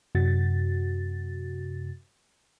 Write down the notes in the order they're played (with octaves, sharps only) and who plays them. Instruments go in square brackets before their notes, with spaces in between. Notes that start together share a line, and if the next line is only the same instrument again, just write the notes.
[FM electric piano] F#2 C3 F#4 A6